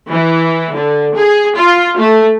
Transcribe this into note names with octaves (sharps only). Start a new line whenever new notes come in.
E3
D3
G#4
F4
A3